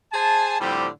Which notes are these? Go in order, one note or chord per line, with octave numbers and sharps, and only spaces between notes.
G#4 C5 G#5 A5
A2 D3 F3 G3 C4 G4